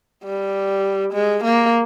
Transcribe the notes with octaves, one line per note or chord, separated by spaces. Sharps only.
G3
G#3
A#3